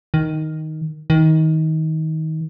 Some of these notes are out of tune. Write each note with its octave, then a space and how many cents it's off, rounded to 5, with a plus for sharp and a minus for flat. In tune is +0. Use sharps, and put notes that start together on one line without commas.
D#3 +5
D#3 +25